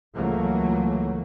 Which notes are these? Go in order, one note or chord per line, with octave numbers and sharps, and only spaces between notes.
C#2 E3 F#3 A3 A#3